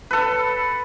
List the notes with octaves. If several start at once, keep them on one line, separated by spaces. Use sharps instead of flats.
A4 B4